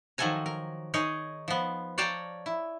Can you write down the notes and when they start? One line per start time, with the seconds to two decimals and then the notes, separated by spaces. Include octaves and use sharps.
0.18 D#3 F3 F#3 A4 G#5 A#5
0.46 A#4
0.94 D#4 G#4 A#4 C#5 D#5
1.48 F3 B3
1.98 C#5 D5 F5 G5 A5 A#5
2.46 E4